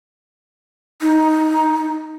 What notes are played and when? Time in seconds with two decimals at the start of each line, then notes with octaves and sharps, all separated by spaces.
1.01 D#4